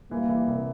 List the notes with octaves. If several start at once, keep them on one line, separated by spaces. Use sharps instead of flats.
E3 G3 A#3
E3
C2